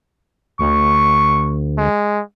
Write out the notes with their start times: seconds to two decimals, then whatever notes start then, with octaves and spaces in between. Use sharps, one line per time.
0.59 D2 C#6
1.78 G#3